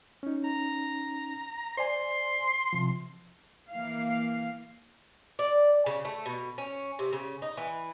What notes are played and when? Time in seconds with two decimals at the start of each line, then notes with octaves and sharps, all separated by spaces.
0.23 C#4 D#4
0.44 A#5
1.77 C5 D5 G#5 C6
2.73 C3 F3
3.71 E3 A#3 F5
5.39 D5
5.86 C#3
6.05 A3
6.26 B2
6.58 C#4
6.99 C3
7.13 C#3
7.42 D#4
7.57 E3